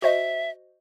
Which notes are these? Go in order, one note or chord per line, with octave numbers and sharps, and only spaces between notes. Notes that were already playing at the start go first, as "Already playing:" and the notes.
F#4 C5 D#5 E5